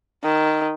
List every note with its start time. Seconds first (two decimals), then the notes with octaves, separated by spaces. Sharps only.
0.24 D#3